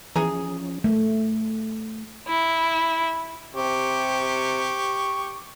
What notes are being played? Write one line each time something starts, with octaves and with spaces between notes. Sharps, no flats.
E3 F3 C#4 G#4 G#5 A#5
A3
E4
C3 G4 C#6